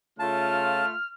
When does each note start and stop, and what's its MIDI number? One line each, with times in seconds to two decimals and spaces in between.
0.19 0.82 49
0.19 0.92 57
0.19 0.92 65
0.19 0.86 81
0.19 1.13 89